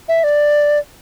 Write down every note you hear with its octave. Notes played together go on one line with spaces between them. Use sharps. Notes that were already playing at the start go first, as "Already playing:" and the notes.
E5
D5